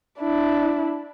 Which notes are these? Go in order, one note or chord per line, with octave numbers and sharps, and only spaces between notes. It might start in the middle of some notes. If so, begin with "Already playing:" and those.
D4 E4